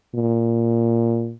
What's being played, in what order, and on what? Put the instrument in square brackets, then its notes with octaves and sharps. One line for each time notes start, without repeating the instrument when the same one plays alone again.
[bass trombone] A#2